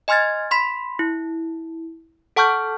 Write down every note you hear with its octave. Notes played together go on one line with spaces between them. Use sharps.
D#5 G#5 C6 F6 G#6 A6
B5 C6 B6
E4
A4 F#5 A5 C#6 F6 G6